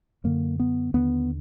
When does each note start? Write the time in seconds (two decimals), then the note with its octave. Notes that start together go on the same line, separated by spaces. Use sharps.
0.24 F#2 D3 A#3
0.60 B3
0.94 D#2 D3 B3